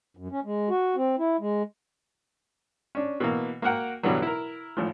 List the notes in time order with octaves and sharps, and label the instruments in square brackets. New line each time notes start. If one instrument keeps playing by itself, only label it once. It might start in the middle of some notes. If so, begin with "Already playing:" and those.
[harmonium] F#2
C#4
G#3
F#4
C4
E4
G#3
[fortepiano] C#4 D4
B2 E3 A#3
A#3 F#4 A#4 F#5 G5
G2 B2 D3 E3 F#3
E4 A#4
G#1 A2 F3